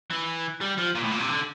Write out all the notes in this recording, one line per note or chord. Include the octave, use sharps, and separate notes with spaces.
E3
G3
F3
A#2
A2
A#2
C3
D3